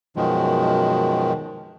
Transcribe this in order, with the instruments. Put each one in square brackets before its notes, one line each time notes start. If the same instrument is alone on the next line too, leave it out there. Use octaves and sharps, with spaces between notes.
[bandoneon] F#2 B2 D#3 F3 G#3